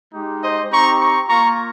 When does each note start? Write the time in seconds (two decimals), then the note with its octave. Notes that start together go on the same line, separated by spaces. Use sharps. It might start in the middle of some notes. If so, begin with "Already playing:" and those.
0.14 G#3 D#4 G4
0.42 C5 D#5
0.71 C4 D#4 G4 A#5 C#6
1.00 A#5 C#6
1.28 A#3 F4 A#5 C#6